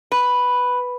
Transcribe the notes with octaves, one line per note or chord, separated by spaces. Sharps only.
B4